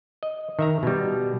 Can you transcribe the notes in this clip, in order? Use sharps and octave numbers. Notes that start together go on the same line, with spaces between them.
D#5
D#3 E5 A#5
B2 G3